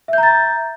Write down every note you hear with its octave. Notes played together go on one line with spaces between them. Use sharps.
E5 A#5 G6 A6